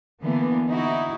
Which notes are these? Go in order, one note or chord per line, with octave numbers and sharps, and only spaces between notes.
D3 E3 A#3 B3
D#4 E4 F#4